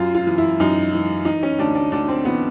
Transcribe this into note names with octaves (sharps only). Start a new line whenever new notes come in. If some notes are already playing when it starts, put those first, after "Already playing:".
Already playing: F#2 F4
F4
E3
E4
F#2 D#4
E3
E3 D#4
C#4
D2 D4
D4
D2 D4
C4
E3 B3